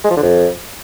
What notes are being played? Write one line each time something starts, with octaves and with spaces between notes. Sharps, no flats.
G#3
F3
D3
F2